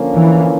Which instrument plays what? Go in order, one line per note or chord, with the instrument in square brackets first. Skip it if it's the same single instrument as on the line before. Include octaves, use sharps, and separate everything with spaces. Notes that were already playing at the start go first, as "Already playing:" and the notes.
Already playing: [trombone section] D3 F3 A#3 C#4
[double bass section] E3